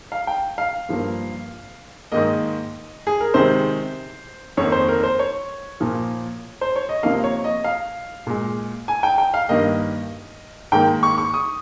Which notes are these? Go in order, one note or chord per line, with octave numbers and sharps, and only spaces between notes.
F5
G5
F5
G2 F3 A#3
G#2 D#3 A#3 D#5
G#4
A#4
C3 D#3 G#3 C5
F2 D#3 A#3 C#5
C5
A#4
C5
C#5
A#2 F3 A#3
C5
C#5
D#5
C3 F3 A#3 F5
C#5
D#5
F5
A#2 G#3
G#5
G5
G5
F5
G2 D#3 A#3 D#5
G#2 D#3 A#3 G5
C#6
C#6
D#6